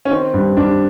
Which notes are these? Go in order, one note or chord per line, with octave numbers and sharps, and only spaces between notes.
C#4
D#3 C4
G2
G2 D4